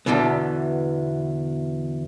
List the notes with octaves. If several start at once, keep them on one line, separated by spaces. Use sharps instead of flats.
E2 G2 B2 D3 E3 B3